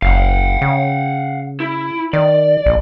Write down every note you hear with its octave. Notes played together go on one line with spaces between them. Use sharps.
F#1 F5 F#5
C#3
E4
D#3 D5
A#1